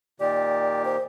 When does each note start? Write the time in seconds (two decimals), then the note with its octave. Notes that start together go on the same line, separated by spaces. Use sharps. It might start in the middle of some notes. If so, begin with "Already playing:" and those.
0.20 A#2 D#3 G4 D5
0.85 C5